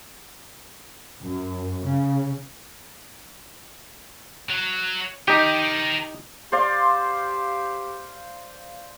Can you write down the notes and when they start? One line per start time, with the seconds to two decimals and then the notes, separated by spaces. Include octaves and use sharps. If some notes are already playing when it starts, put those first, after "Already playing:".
1.23 F#2
1.82 C#3
4.50 F#3
5.28 D#4 G4 A#4 G5
6.52 G4 C5 D5 F5